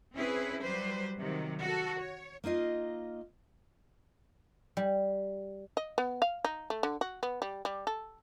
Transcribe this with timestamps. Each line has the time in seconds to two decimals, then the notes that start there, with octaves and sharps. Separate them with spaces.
0.13 C4 C#4 E4 G#4 B4
0.61 F#3 G3 B4 C5
1.19 C3 D#3 F#3
1.61 F#4 A4
1.98 C#5
2.44 A#3 D#4 F4 D#5 F5
4.77 G3
5.77 D#5
5.98 B3
6.22 F5
6.45 D#4
6.70 A3
6.83 D3
7.01 F#4
7.23 B3
7.42 G3
7.65 G3
7.87 A4